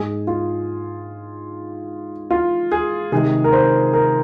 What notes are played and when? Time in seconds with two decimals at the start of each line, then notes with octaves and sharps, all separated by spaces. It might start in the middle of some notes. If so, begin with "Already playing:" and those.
Already playing: G#2 G#3 G#4
0.27 F4
2.31 F4
2.72 G#4
3.12 C3 D#3 G#3 G#4
3.44 A#4
3.53 C5
3.93 A#4